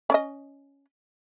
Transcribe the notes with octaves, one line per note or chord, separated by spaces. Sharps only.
C#4 D5 D#5